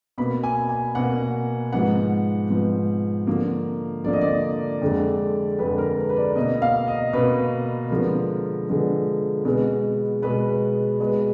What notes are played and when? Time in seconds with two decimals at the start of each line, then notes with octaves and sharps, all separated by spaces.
0.18 B2 A#3 B5
0.44 G#5
0.69 G#5
0.95 B2 A#3 F#5
1.72 G#2 F3 B3 F#5
2.50 G#2 F3 B3
3.27 D3 F3 A#3
4.04 D3 F3 A#3 D5
4.13 D#5
4.21 D5
4.82 F2 D3 G#3
5.59 F2 D3 G#3 B4
5.78 A#4
5.98 B4
6.09 B4
6.16 D5
6.36 B2 A#3 D#5
6.62 F5
6.87 D#5
7.13 B2 A#3 B4
7.90 D3 F3 G#3 B3 A#4
8.68 D3 F3 G#3 B3
9.45 B2 G#3 B3
10.22 B2 G#3 B3 B4
11.00 B2 G#3 B3